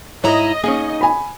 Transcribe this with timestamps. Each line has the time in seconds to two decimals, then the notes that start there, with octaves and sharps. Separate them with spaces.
0.24 G#2 E4 C#5 D#5 A#5
0.64 A#3 C#4 D#4 G#4
1.01 G#5 B5